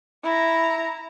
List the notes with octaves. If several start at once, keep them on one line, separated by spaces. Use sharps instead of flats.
E4 A#5